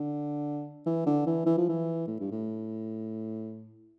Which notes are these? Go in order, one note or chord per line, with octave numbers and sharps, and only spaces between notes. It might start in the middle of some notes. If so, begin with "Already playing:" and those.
Already playing: D3
E3
D3
E3
E3
F3
E3
A2
G2
A2